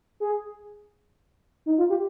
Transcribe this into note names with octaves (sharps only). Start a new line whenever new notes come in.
G#4
D#4
F4
G4